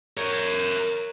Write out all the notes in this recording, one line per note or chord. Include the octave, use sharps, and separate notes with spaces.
A#4 C#5